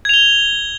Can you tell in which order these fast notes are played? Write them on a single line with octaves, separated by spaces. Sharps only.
G#6 F7 G7